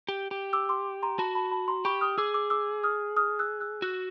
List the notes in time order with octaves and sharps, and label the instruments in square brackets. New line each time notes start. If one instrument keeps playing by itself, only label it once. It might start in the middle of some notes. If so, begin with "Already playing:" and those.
[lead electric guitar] G4
G4
[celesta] D6 E6
C6 D6
A#5 C6
[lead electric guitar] F#4 [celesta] A5 B5
[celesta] A5 B5
A5 B5
A#5 C6
[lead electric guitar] G4 [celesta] B5 C#6
[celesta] D#6 F6
[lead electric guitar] G#4 [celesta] D6 E6
[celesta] D6 E6
D6 E6
D#6 F6
D#6 F6
E6 F#6
E6 F#6
[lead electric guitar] F#4 [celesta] E6 F#6